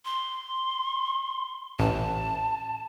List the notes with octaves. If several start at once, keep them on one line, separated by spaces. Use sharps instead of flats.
C6
A1 A5